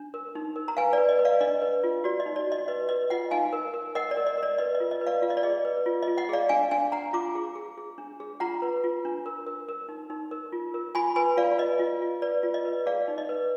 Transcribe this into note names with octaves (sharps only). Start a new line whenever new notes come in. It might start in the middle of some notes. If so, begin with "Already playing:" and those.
Already playing: D4
A#4
D#4
A#4
A#5
B4 F5 G#5
B4 D5
D#5
B4
D5 F5
D4 D#5
B4
F4
F#4 D5
D#5
D#4
D5
F#4
D#5
B4 D#5
B4 D#5
F4 D#5 F#5
D#4 F5 G#5
A#4
A#4
A#4 D#5 F#5
D5
A#4
D#5
A#4 D5
B4 D#5
D#5
F4
D#5
B4
D5 F5
F4 F5
D#5
D5
G#4 D#5
B4
F4
D#5
F4
D#5 F#5
G#4 D5 F5
D4 F5 G#5
D4 F5 G#5
D4 F#5 A#5
F4 A#5 D6
G#4
G#4
G#4
D4
G#4
F4 F#5 A#5
B4
F4
D4
A#4
A#4
A#4
D#4
D#4
A#4
F4
A#4
F4 G#5 B5
B4 G#5 B5
F4 D5 F5
B4 D#5
F4
F4
B4 D5
F4
D#5
B4
G#4 D5 F5
D#4
D#5
B4